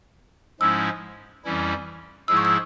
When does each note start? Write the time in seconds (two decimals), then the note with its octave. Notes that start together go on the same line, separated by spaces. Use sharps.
0.60 G#2 F3 G#3 C#4 E4 E6
1.44 F2 E3 G3 C#4 E4
2.28 G#2 F3 G#3 E4 G#4 E6
2.37 C#6
2.45 E6